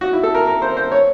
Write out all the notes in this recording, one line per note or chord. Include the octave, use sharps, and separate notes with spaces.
F#4
E4
A4
A#4
A#4
C5
C5
C#5